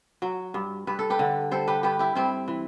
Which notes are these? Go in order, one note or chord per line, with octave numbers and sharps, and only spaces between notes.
F#3
G2
G2 B4
A4
G4 B4
D3
G3 A4 C5
G4 B4
G2 G4 B4
E4 G4
G2 C4 E4
E3